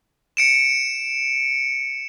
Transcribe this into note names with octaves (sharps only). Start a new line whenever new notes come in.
C#7 D7 E7